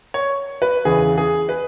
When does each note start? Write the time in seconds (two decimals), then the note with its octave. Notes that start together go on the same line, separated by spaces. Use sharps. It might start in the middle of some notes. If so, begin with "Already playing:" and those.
0.14 C#5
0.62 B4
0.85 E2 C#3 E3 G#4
1.18 G#4
1.49 B4